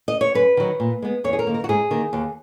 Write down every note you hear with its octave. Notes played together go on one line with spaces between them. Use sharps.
D#5
C#5
F#2 B4
D#3 F#3
A#2
G#3 B3
E2 C#5
G#4
A#4
D#3 A#3
A#4
F#4
G#2 G#4
D#3 A#3
D#2